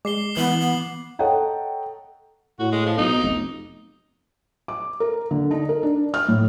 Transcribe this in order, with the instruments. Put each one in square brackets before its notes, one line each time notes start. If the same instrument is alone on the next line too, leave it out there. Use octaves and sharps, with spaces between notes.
[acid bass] G#3 [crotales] D6 C7 G7
[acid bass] E3 [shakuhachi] B3 [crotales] F#7
[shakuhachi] B3
[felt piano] A4 C#5 D#5 F#5 G5 A#5
[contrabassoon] A2 [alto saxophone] F#4
[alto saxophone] G#3
F3
[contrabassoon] B1 [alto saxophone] D#4
[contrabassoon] F1
[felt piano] D6
A#4
D3
D#4
A#4
D4
F6
A2